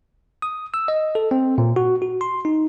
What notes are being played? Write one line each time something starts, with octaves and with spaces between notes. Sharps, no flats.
D#6
E6
D#5
A4
C4
A#2
F#4
F#4
C6
D#4